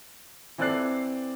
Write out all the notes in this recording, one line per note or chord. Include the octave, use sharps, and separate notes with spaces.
E3 C4 A4 D5 F#6 C7